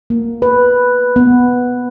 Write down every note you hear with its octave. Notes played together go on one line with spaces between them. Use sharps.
A#3
B4
B3